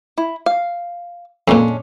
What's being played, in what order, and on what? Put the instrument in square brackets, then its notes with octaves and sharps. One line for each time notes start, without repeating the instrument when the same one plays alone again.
[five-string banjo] E4
F5
[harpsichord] F2 A#2 [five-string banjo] G#3 C#4 D4